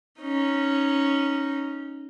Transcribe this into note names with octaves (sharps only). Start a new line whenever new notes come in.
C#4 D#4